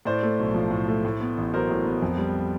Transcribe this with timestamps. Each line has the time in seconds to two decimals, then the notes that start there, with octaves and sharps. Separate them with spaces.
0.05 A2 C5 D5
0.23 A3
0.39 B1
0.55 F3
0.71 A2
0.88 A3
1.05 A2
1.20 B3
1.37 A1
1.54 F#3 A#4 C5
1.70 A2
1.86 B3
2.02 F2
2.18 G3